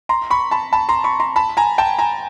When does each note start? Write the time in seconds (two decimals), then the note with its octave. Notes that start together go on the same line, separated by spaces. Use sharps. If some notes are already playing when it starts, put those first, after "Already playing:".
0.09 A#5 C6
0.30 B5 C#6
0.51 A5 B5
0.73 A5 B5
0.89 A#5 C6
1.04 B5 C#6
1.20 A#5 C6
1.36 A5 B5
1.57 G#5 A#5
1.78 G5 A5
1.99 G#5 A#5